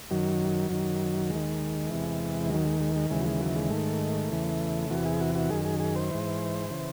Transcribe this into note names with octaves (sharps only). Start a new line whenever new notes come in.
F#2 D#3 F#3
F#2 D#3
D#2 G#3
D#3
E2 C3 E3
D#2 D#3 F#3
G#3
G#3
G#3
D#2 C#3 E3 G#3
F#3
G#3
F#3
G#3
G#2 D#3 A3
E2 C#3 E3
E2 C3 E3 F#4
G#4
F#4
F#4
F#2 D#3 G#4
G#4
G#4
C5
G#2 E3
C#3 E3